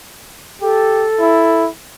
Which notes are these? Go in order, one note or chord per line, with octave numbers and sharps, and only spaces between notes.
G4 A4
E4